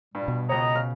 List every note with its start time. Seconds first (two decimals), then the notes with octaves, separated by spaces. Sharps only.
0.15 G2 A#2 G3
0.28 B2
0.49 C#2 C#5 D#5 A#5
0.75 C#3 F6